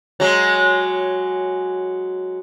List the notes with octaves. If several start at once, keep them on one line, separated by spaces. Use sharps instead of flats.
F#3 G#3